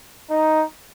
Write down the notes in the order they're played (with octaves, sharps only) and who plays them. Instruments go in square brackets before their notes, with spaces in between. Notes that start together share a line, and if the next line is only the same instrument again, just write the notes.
[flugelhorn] D#4